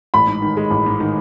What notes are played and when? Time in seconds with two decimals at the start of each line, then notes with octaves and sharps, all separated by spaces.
0.14 A1 B5
0.27 G#2
0.42 D#3
0.57 G#3
0.71 A1
0.86 G#2
1.00 D#3